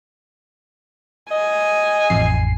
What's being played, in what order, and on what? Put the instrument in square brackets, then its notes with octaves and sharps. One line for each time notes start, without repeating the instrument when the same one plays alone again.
[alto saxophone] D#5 [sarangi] G#5
[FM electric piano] A1 F2 C7